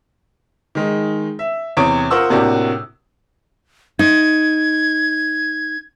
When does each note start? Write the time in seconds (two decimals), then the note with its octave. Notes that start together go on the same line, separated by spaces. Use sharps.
0.75 D#3 G#3 D#4
1.39 E5
1.77 E2 C3 C#5 D#6 D7
2.11 F4 A#4 C5 F#5 C#6 E6
2.30 A2 C3 A#3 D4 F#4 G4
3.99 D#4 G#6